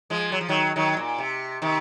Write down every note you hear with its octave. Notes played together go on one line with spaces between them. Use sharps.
F3 G#3
F#3
F3
D#3 F#3
D#3 F#3
A#2
C3
C3 D#3